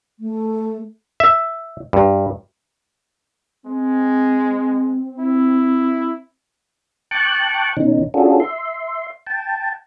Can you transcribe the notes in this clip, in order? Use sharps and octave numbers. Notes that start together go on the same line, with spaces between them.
A3
E5
G2
G#3 C4
E4
G5 A5 C#6 D6 F#6
B2 D#3 C#4 D#4
C#4 D4 F4 F#4 G#4 A4
E5 C6
G5 A5